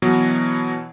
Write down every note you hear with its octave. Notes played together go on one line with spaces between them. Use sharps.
B2 E3 F#3 B3